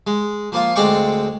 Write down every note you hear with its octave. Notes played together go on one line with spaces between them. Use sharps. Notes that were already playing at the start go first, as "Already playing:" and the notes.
G#3
F3 A#3 F4
D2 G#3 C4 D5 G5 C#6